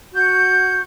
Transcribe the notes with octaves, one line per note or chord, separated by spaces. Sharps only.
F#4 G6